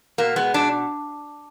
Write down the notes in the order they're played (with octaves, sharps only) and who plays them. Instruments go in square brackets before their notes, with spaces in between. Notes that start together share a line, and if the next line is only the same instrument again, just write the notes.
[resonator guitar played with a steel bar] B2 A#3
G#3 B3
B2 D4